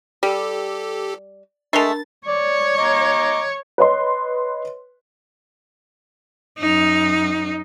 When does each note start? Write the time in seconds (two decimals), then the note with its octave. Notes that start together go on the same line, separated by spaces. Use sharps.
0.23 G3 G4 A4
1.73 G#3 A3 D4 A#4 A5 A6
2.27 C#5 D5
2.78 D#5 A#5 D6
3.78 B4 C#5 D#5 C6
6.59 F#2 D#4